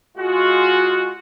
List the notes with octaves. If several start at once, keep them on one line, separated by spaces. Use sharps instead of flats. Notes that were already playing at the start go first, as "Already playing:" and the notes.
G#3 F4 F#4